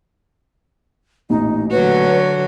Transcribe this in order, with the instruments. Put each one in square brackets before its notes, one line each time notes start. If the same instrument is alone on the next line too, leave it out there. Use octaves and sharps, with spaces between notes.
[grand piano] A1 A#2 [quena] D#4
[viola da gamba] D3 F#3 F#4 [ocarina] B4 [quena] C#5